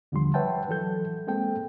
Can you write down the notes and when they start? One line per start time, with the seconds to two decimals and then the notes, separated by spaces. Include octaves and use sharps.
0.12 D#2 D3 F3 G3 C6
0.34 B4 C#5 E5 F#5 G5 A5
0.69 E3 F#3 A4 G6
1.27 G#3 A#3 C4 A4 G5